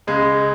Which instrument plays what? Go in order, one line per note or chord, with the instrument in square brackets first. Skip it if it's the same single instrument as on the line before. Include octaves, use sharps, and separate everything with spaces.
[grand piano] C#2 G#3